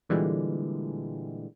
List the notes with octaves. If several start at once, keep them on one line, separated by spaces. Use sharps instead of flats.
A#2 D3 E3 G3 G#3